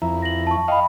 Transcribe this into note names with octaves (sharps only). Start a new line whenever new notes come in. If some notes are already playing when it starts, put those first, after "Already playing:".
F2 E4 A#5
A#6 F#7
A5 C#6
D#5 F5 G5 B5